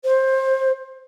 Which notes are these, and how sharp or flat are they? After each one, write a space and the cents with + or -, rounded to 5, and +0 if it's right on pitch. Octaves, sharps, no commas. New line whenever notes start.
C5 +20